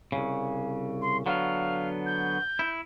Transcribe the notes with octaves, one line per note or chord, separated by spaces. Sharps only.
C2 G#2 C#3
C6
D3 F#3 B3 F5
G6
E4